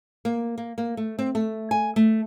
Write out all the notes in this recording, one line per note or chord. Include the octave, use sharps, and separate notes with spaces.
A#3
A#3
A#3
A3
C4
A3
G#5
A3